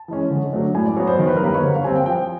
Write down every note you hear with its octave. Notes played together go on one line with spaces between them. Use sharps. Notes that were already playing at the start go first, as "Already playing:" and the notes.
Already playing: A5
E3 G#3 C#4
D3
F#3 A3 D4
A2 G#5
D5
F#3 B3 C#5
C5
D#3 C5
B4
A#4
G3 A#3 B4
C#5
D3 C5
F5
G3 C4 G#5
G5
F3 G5